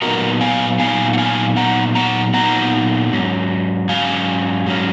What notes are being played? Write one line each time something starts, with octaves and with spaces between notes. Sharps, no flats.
A#2 F#3 B3 D#4 F#4 A#4
F5 G#5
A#2 F#3 B3 D#4 F5 G#5
F#5
F5 G#5
A#2 F#3 B3 D#4 F#5 A#5
F#5 A#5
A#2 F#3 B3 D#4 F#5 A#5
G#2 F#3 C#4
G#2 F#3 C#4 F5 G#5
G#2 F#3 C#4